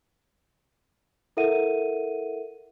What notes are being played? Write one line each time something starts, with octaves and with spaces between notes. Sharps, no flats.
E4 A4 A#4 E5 F#5 D#7